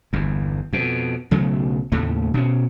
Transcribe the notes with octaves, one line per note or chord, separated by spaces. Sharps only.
G1 E2
F2 B2
B1 C#3 F#3 A3
D#2 A2 C#3 A3
B2 C4 C#4